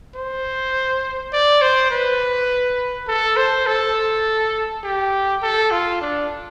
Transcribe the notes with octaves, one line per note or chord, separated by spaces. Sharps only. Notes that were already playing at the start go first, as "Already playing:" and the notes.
C5
D5
C5
B4
A4
C5
A4
G4
A4
F4
D4